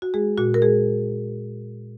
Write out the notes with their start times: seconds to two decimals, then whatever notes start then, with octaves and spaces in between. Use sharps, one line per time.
0.02 F#4
0.14 G#3 G#4
0.38 A#2 F#4
0.54 A#4
0.62 G#3 G#4